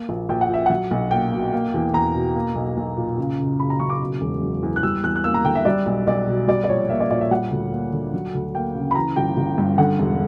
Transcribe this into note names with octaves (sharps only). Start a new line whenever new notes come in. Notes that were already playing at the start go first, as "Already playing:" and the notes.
Already playing: A#3
A#1
A#1 G5
F#5
A#2 E5
F#3 F#5
B1
A#3 G5
B2
A#3
E2
E2 A#5
B2
A#3
B1
B1
A#2
C#3
F#1
F#1 B5
A#5
F#2 C#6
D6
B2
E1
F#3
E2
F#6
G3 E6
E2 F#6
F#6
A#3 E6
A#5
D3 G5
E5
G3 D5
B1
B1 D5
B2
G3 D5
D5
A#1 C#5
A#3 E5
D5
A#2 D5
E5
G3 F#5
D2
A#3
D3
F#3
D2
A#3 G5
C#3
B5
E3 A#5
G1 G5
G1
G2
D3 F#5
E1